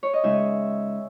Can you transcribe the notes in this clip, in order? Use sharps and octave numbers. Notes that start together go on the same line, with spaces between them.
C#5
D#5
C#3 G#3 D#4 E5